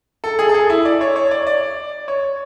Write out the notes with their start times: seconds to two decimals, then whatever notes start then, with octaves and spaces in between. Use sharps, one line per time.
0.24 A4
0.39 G#4
0.49 A4
0.54 G#4
0.70 E4
0.85 D5
1.01 C#5
1.16 C#5
1.31 D5
1.47 D5
2.08 C#5